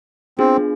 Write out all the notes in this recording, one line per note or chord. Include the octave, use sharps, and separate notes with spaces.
B3 C4 D4 F4 G#4